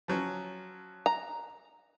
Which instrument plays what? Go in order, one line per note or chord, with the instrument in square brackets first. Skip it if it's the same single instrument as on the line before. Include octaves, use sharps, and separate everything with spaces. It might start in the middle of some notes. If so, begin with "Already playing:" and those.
[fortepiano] F3 F#3 C#4
[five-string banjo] A#5